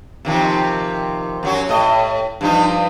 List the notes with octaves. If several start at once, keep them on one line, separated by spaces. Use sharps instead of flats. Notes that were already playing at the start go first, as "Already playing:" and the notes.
C3 D#3 F3
F#2 F#3 F#4
A2 D#5
G2 F3 D#4